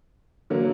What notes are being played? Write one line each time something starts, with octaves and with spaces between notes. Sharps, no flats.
D3 F#3 A#3